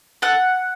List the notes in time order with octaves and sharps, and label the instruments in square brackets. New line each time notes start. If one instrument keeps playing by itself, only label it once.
[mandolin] A4 F#5